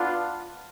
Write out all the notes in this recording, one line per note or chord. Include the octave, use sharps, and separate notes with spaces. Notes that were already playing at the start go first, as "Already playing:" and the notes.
Already playing: B3 D4 F4